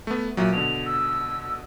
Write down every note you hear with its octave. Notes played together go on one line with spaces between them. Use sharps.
A3 B3
A#2 F#3 E5
B2 D3 F7
E6